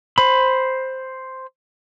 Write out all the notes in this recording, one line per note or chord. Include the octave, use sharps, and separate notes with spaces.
C5 B5